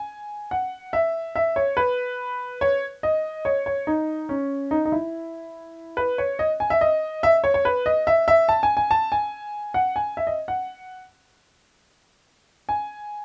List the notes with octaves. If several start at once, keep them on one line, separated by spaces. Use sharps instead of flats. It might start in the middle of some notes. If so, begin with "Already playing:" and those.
Already playing: G#5
F#5
E5
E5
C#5
B4
C#5
D#5
C#5
C#5
D#4
C#4
D#4
D#4
E4
B4
C#5
D#5
G#5
E5
D#5
E5
C#5
C#5
B4
D#5
E5
E5
A5
G#5
G#5
A5
G#5
F#5
G#5
E5
D#5
F#5
G#5